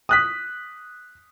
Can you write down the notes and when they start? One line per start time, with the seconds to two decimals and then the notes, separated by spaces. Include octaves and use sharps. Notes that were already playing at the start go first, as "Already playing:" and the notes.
0.09 D#6 F#6 B6